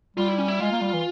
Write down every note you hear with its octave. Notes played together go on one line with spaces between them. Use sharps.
G3 F4
E4
C#4
E4
G#3 F4
A#3
G3
E3